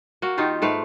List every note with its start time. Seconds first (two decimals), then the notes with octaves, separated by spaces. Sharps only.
0.22 A#3 F#4
0.38 D#3 D#4 F4 G4
0.62 G#2 A3 B4 F5